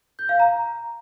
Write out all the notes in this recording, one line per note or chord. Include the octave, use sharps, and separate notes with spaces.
G6
F5
A#5